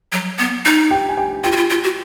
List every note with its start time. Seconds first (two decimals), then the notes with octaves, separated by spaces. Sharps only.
0.12 F#3
0.38 B3
0.65 D#4
0.91 G4 G5
1.09 G#5
1.17 G4 G5
1.44 F4 G4 G5
1.52 F#4
1.56 F4
1.70 F4
1.83 F#4